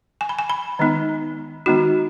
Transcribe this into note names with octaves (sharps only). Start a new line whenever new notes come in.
G#5
B5
G#5
B5
D#3 G#3 B3 D#4
D#3 G#3 B3 D#4 F#4